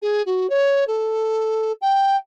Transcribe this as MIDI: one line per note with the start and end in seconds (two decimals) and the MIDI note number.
0.02 0.22 68
0.26 0.49 66
0.50 0.84 73
0.87 1.72 69
1.81 2.16 79